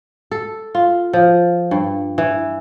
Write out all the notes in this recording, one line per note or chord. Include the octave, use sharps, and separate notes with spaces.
A4
F4
F3
G2
E3